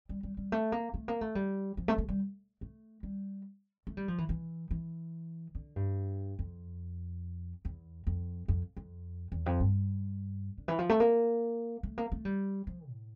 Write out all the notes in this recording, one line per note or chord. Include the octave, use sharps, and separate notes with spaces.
G3
G3
G3
A3
A#3
A3
A#3
A3
G3
F3
A3
A3
G3
A3
G3
A3
G3
F3
E3
E3
E3
D3
G2
F2
E2
F2
F2
F2
E2
F2
G2
D3
E3
F3
A3
A#3
A3
A#3
A3
G3
F3
A2